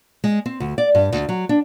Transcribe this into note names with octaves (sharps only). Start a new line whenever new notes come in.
G#3
C4
D2
D5
G2
D2
F#3
D4